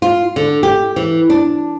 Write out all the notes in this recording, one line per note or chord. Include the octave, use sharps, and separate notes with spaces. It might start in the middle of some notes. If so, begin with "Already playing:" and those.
F4
D3
G4
E3
D4